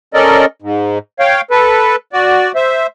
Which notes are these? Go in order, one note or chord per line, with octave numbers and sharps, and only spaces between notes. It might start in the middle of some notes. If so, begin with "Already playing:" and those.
C#4 A4 A#4 D5 D#5
G#2
C#5 F5 G5
A4 B4
F#4 D5
C5 E5